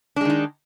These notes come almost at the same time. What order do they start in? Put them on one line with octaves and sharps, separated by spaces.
D4 G#3 D#3 D#4